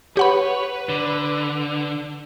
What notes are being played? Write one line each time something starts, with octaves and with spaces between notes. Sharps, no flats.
G4 B4 C#5 F#5 B5
D3